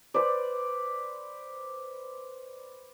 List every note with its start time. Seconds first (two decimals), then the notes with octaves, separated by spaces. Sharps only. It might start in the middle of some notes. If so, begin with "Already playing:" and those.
0.14 B4 C5 D5